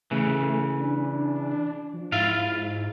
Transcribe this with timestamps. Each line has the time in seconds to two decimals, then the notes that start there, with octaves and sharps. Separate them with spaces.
0.11 C#3 E3 A3
0.80 D4
1.94 F3
2.12 G#2 E4 F4 F5